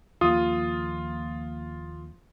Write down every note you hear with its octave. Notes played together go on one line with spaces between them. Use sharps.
D#2 F3 A#3 F4 D#6